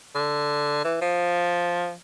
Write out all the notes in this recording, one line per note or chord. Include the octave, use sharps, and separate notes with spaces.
D3
E3
F3